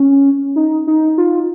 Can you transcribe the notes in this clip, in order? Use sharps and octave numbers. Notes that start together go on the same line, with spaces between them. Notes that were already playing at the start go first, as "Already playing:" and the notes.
Already playing: C#4
D#4
D#4
F4